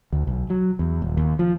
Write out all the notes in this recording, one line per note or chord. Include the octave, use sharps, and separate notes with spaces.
D2
B1
F#3
E2
D#1
D#2
F3